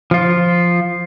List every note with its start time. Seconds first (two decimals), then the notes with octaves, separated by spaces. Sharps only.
0.11 F3 F4